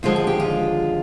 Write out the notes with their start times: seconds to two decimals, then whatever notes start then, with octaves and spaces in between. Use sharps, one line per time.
0.03 D#2 D3 F3 G#3 F4
0.16 G#4
0.27 G4
0.40 F4